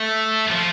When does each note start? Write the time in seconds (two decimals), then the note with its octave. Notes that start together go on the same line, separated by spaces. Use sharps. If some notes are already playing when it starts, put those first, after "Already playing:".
Already playing: A3
0.51 F3